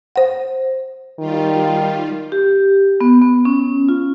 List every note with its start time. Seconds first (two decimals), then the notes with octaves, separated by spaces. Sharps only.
0.16 C5 F#5
1.19 D#3 G3 F4
2.32 G4
3.01 B3
3.22 B3
3.45 C#4
3.89 F4